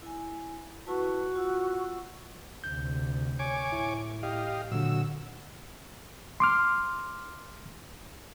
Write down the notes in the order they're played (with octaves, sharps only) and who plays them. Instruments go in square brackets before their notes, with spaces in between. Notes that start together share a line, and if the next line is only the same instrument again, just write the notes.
[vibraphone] E4 G#5
[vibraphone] E4 B4 A5 [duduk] F#4
[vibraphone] F4 F#5 E6
[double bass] D2 C3 [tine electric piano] G6
[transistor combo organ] C#5 G#5 D6
[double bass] A2 [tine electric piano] E4
[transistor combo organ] G4 D#5 F5
[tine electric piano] A#2 D3 [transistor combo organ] F#3 E6
[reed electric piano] C6 D6 F6